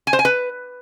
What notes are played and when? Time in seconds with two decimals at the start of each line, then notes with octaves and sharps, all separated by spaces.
0.07 G#5
0.13 C5
0.19 G#5
0.25 B4